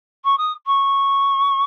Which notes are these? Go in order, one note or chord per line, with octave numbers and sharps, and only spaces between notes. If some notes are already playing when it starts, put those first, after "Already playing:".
C#6
D#6
C#6